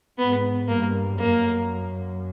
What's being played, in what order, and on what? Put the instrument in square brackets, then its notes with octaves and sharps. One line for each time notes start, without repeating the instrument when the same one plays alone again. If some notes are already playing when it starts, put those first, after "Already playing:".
[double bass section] G#2 [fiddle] B3
[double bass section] G2 [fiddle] A#3
[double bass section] F#2 [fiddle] A#3